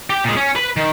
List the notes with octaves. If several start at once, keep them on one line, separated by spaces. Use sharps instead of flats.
G4 G5
A#2 G#3
C#4
B4 B5
D#3